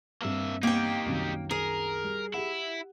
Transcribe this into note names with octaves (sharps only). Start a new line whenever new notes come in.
G2 A#3 C4 E5
A#3 D#4 G4 G5
C2 F#2 D#3
G#4 A#4
G3
E4 G4 F#5